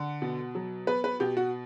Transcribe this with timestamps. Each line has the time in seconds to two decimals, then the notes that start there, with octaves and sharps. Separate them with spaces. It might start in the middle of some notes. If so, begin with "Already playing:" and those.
Already playing: D3 F#5
0.22 B2
0.55 F#3
0.87 B3 B4
1.04 B4
1.20 B2 G4
1.37 F#4